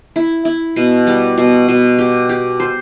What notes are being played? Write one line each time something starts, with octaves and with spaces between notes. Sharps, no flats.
E4
E4
B2
G3
B2
B2
G4
G4
C5